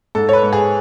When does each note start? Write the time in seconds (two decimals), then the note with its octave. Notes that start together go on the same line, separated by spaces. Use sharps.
0.15 G#2 A4
0.29 C#5
0.33 B4
0.43 G#2
0.53 G#4